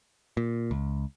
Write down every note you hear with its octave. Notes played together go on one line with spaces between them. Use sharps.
A#2
C#2